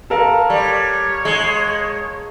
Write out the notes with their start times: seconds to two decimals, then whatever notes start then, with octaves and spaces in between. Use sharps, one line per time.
0.10 A4 A#4 F5
0.50 G3 C#5
1.25 G#3